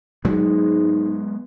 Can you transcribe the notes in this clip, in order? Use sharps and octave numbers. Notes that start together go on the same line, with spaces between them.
G#2 F#3 G#3 B3